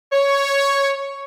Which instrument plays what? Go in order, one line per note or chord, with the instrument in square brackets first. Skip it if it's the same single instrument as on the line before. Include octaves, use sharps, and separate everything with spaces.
[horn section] C#5